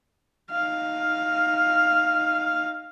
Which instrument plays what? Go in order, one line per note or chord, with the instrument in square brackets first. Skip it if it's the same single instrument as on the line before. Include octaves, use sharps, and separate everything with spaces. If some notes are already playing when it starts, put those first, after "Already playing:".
[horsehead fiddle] D#4 F5